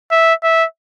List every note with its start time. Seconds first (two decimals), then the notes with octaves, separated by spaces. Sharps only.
0.11 E5
0.43 E5